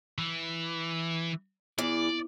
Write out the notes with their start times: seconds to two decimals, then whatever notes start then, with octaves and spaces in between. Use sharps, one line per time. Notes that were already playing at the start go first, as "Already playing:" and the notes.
0.18 E3
1.78 E2 D5